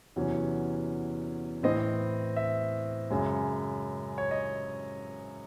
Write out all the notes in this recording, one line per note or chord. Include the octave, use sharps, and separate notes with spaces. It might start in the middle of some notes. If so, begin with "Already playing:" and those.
E2 C3 F#3 C#4
A2 E3 C4 D#5
E5
F#2 C#3 G#3
C#5
D#5